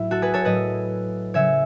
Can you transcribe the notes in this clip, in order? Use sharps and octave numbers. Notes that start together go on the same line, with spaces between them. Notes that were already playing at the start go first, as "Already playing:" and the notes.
Already playing: A2 F#3 E4
F#4 A4
G#4 B4
A4 C#5
A2 F#3 B4 D#5
C#3 F#3 C#5 E5